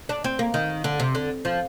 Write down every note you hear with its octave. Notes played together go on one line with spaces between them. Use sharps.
D4
C4
A#3
D#3
D3
C3
D3
F3